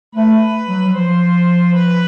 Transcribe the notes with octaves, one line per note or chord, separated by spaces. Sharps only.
A3 B4
F#3
F#3
F3 C5
B4